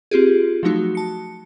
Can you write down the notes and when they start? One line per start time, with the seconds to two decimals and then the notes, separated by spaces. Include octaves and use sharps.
0.11 C4 F4 G4 G#4
0.63 F3 F#3 A3 D#4 F#4
0.95 A5 C#7